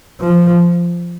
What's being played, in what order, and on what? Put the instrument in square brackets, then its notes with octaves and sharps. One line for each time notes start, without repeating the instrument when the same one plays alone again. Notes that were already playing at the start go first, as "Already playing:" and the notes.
[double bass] F3